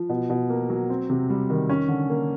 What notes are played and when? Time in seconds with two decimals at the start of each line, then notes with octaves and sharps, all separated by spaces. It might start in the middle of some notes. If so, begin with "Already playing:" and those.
Already playing: F3
0.09 B2
0.30 B2
0.50 A#3
0.70 F#3
0.90 C4
1.10 C3
1.30 G3
1.50 D#3
1.69 C#4
1.88 D3
2.10 A#3